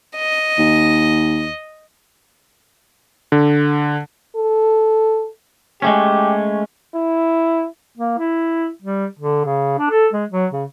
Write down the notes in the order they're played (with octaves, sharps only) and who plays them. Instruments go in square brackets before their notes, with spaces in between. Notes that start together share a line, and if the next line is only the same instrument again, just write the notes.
[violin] D#5
[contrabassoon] D#2
[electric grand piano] D3
[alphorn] A4
[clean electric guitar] G#3 A3 C#4 [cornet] G4
[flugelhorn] E4
[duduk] A#3
E4
G3
D3
C#3
D4
A4
G#3
F#3
C#3